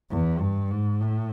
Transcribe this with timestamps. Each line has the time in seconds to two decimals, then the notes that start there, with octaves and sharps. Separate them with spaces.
0.10 E2
0.41 G2
0.71 G#2
1.01 A2